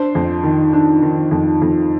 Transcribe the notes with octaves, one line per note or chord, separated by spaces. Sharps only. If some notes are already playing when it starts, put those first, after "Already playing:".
Already playing: D4 C5
F2
D#3
D4
D#3
F2
F2